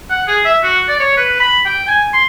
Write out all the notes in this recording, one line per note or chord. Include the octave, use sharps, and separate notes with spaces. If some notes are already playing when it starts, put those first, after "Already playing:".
F#5
G#4
E5
F#4
D5
C#5
B4
B5
G5
G#5
C6